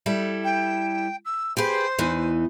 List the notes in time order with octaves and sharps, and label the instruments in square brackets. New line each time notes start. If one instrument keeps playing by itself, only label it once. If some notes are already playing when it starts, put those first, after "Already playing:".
[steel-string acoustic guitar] G3 E4 A4
[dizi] G5
E6
[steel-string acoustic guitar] G4 G#4 B4 [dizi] C5
[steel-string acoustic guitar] E2 E3 D#4